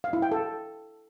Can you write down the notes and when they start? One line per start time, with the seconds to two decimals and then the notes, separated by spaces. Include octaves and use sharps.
0.04 F5
0.13 E4
0.22 G5
0.32 A4